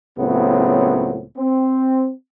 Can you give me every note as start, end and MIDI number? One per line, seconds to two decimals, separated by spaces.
0.18 1.24 37
0.18 1.24 45
0.18 1.24 49
0.18 1.24 54
0.18 1.24 59
0.18 1.24 60
1.37 2.12 60